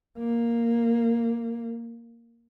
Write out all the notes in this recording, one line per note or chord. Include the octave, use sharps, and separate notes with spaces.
A#3